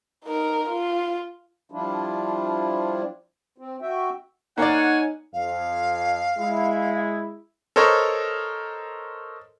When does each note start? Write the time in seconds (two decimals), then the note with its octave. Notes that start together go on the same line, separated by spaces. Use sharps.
0.25 D#4 A#4
0.69 F4
1.72 F3 G3 D4 E4 F4
3.58 C4
3.82 F#4 E5 G5
4.58 A#3 D#4 C#5 D5 F#5 G#5
5.34 F2 F5
6.38 G#3 E4
7.76 A4 A#4 C5 C#5 D#5